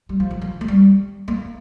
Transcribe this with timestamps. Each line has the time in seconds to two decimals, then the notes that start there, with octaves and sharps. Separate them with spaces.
0.09 G3
0.20 F3
0.31 D#3
0.41 F3
0.61 A3
0.68 G3
1.28 A#3